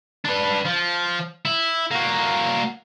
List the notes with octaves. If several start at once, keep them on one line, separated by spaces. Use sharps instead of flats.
D4 B4
F3
E4
A#3 F#4